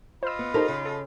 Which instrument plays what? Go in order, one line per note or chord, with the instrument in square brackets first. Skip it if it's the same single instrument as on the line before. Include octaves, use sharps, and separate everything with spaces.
[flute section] F4 D#5 B5 [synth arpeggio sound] C5 E6
[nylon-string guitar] B3
[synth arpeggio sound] D#4 A4 [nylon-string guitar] G4 A#4 C5
[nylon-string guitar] C#3
[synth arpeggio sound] A4